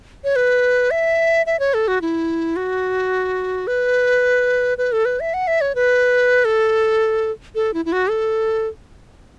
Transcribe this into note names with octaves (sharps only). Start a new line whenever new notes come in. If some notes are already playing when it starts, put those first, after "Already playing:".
C#5
B4
E5
E5
C#5
A4
F#4
E4
F#4
B4
B4
A4
B4
E5
F#5
E5
C#5
B4
A4
A4
E4
E4
F#4
A4